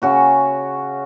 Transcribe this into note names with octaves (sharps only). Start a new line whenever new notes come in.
C#3 F#4 C#5